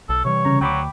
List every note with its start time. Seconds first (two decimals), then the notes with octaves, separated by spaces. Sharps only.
0.09 B1 A4
0.25 C3 E3 G3 C#5
0.45 C#3 A#5
0.61 D2 F#3 G5 B5 D6